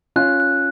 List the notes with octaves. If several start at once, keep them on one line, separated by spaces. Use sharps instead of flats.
C#4 F4 F#6
F#6